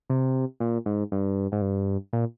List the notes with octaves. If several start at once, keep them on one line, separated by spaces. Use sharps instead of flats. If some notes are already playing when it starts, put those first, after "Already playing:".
C3
A#2
G#2
G2
G#2
G2
A#2